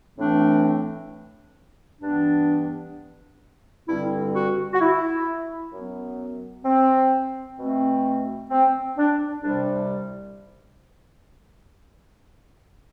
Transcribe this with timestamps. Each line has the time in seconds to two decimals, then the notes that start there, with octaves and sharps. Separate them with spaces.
0.17 A2 E3 A3 C4 D4
2.02 G2 E3 B3 D4
3.87 G2 D3 G3 C4 E4
4.34 F#4
4.73 F#4
4.80 E4
5.72 F#2 F#3 B3
6.65 C4
7.57 B2 A3 C4
8.50 C4
8.97 D4
9.42 C2 C3 G3 C4 D4